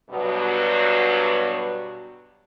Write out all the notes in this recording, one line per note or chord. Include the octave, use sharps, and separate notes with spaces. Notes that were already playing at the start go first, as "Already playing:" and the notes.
G2 B2 F#3